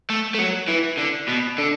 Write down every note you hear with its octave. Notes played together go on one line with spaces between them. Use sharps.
A3
A3
F#3
E3
D3
B2
D3